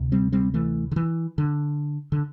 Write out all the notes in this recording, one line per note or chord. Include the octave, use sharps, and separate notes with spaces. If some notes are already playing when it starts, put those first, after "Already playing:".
Already playing: D2 C3
G3 C4
G3 C4
E3 A3
D3
E3
D3
D3